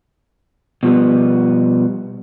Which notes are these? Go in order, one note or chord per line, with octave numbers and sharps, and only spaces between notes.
B2 F3 G3 B3